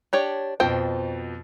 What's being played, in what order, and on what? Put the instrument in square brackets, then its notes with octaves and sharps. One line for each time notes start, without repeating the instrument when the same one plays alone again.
[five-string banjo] D4 G4 C#5
[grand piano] F2 B2 F3 [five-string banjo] C5 G5